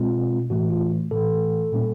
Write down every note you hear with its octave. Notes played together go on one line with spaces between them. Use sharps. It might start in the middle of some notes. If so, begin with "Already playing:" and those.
Already playing: B2 G#3 C4 F4
A2 E3 A3 F#4
F4
A2 E3 A3 A4
A#2 G3 A#3 C#4